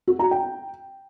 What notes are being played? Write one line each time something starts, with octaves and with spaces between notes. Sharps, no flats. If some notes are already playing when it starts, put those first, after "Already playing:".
F#4
A#5
G5